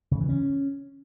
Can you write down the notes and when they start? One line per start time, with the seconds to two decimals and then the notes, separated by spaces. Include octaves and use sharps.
0.11 C#3
0.20 E3
0.29 C#4